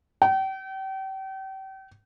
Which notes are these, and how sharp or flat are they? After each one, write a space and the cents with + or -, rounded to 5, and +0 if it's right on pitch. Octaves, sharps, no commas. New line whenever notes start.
G5 -35